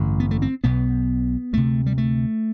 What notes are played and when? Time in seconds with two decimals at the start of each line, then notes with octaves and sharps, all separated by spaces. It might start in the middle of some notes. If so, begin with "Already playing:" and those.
Already playing: A1 G2 D3
0.20 B3
0.31 A3
0.42 C4
0.64 B1 B2 B3
1.53 D2 C3 A3
1.86 G3
1.98 A3